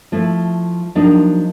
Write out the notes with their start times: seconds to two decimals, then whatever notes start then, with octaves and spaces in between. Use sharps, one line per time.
0.12 F3 A3 E4
0.95 F3 F#3 A#3 D4 D#4